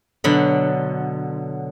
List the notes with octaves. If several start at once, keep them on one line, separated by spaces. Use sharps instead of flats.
B2 D3 F#3 B5